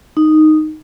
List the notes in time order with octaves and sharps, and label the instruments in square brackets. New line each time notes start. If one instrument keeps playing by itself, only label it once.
[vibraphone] D#4